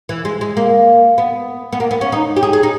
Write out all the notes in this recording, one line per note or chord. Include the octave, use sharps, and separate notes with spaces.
E3
G#3
G#3
A#3
B3
B3
A#3
B3
C#4
D#4
G4
G#4
G#4
D#4